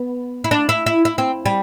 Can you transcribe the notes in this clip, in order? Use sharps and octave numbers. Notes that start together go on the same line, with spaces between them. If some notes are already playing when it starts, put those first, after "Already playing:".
Already playing: B3
E4
D4
E4
E4
E4
C4
G3